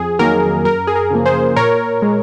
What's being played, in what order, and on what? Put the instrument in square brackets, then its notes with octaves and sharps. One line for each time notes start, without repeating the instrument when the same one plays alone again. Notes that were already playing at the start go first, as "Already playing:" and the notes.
Already playing: [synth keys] F2 G#4
D#3 F#3 A#3 A#4
F#2 A#4
G#4
A#4
C#3 F3 A#3
G#4 C5
A#2 A#4 C#5
G#3